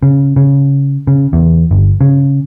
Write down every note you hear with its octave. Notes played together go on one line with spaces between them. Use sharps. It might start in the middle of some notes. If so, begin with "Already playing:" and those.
C#3
C#3
C#3
E2
G1
C#3